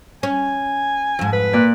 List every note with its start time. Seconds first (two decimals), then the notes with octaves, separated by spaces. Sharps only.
0.23 C#4 G#5
1.19 F2 G#2
1.33 B4
1.53 A#2 D5 F#6